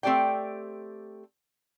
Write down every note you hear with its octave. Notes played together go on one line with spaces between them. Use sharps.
A3 C4 G4 D5 G5